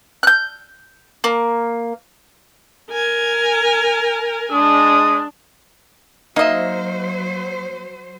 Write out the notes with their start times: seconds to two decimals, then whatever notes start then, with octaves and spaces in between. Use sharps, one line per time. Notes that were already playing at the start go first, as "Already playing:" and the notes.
0.23 F#6 G6
1.24 A#3
2.91 A#4 G#5
4.52 G#3 D4 D#6
6.36 F#3 A#3 D#4 C5 D#5 E5